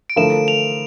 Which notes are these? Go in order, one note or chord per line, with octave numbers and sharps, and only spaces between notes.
D7
D3 F3 A3 E4 A#4 E7
F7